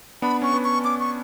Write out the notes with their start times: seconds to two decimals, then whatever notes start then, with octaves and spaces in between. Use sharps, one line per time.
0.22 B3 D4 B5
0.42 C#4 C#6
0.54 B3
0.64 C#6
0.84 C#4 D6
1.00 C#6